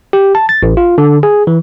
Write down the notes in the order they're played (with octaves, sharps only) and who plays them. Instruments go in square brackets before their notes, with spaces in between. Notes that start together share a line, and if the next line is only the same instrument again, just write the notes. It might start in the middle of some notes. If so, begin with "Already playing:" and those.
[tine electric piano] G4
A5
A6
A1
F4
D3
G#4
E3